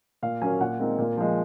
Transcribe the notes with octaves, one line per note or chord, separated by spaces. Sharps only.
A#2 F5
F#3 A#3 C#4 G#5
A#2 F#5
G#3 C4 D#4 A#4
A#2
F3 G#3